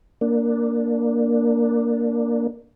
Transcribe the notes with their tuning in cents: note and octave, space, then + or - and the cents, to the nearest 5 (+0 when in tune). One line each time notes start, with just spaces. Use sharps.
A#3 +0 D4 +0